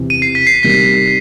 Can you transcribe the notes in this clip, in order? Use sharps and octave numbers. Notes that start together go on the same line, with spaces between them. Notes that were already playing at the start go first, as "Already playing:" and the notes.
Already playing: E2 C3 E3
D#7
C7
B6
C7
C3 D#3 G3 B6